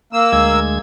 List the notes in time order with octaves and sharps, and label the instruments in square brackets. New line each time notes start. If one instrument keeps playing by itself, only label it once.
[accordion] A#3 E6
[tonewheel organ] D2 G#3 G#6